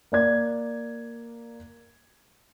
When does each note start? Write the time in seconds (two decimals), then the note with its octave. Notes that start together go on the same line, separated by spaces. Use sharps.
0.12 A#3 D5 G#6